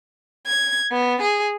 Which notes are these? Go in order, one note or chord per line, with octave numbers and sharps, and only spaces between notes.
G#6
B3
G#4